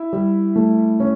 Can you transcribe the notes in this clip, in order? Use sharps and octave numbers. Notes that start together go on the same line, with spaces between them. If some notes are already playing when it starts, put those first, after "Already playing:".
Already playing: E4 E5
G3
A3
C#4